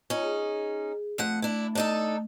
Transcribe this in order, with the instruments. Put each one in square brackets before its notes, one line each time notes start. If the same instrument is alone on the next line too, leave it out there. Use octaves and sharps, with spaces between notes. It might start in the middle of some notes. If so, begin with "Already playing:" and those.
[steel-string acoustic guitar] C#4 D#4 [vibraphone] F4 C#5
[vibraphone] G#4
[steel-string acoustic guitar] F2 F3 F#5 [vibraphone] A3
[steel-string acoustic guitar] D4 E4
D4 D#4 A4